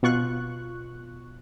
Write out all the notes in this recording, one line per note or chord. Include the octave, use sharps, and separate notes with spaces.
B2 F4 C#6 F#6